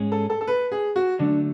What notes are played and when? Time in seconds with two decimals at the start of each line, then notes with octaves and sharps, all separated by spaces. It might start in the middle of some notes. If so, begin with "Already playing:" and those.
Already playing: G#2 G#3 C#4 G#4
0.12 A4
0.30 A4
0.41 A4
0.47 B4
0.72 G#4
0.96 F#4
1.19 D3 F#3 A3 D4